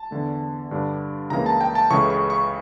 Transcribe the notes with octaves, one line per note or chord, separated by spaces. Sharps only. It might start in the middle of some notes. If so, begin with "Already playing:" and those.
Already playing: A5
E2 D3 A3
G2 D3 G3 D4
C#2 C#3 E3 A#3 A#5
A5
G5
A5
C#2 C#3 E3 A3 C#4 C#6
C#6
C#6